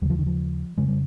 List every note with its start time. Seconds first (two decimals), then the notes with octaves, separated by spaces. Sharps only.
0.02 D#2 G3
0.05 C#3
0.10 F3
0.19 D#3
0.27 F3
0.78 F2 C#3 G#3
0.88 G3